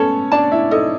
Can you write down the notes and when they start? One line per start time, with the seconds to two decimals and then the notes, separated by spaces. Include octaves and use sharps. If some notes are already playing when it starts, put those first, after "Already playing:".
Already playing: B3 C#4 A4 C#5
0.32 D4 D5 A5
0.52 E4 E5
0.71 D#4 A4 D#5